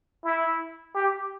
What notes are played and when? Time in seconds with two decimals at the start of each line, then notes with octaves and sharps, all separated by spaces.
0.24 E4
0.95 G4